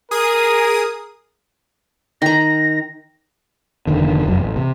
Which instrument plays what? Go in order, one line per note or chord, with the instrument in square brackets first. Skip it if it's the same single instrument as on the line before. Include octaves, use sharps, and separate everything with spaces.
[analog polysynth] G#4 D#6 [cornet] A#4
[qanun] D#3 A#5 [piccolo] A#6
[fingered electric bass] F1 B1 D3 D#3
F1 F#2 F#3
A1
C3